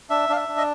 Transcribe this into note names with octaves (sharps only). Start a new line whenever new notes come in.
D4 E5
D4 F5
E5
D4
D#5